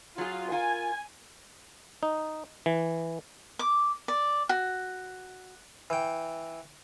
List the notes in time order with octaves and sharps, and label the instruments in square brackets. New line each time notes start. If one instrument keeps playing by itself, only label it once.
[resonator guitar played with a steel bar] F#3 G#4 [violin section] F4
[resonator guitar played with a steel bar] F4 A#4 [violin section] G#5
[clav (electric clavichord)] D#4
E3
[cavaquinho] D6
D5
F#4
[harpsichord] E3 G5